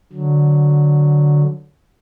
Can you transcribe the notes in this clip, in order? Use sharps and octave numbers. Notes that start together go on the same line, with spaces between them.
D3 F#3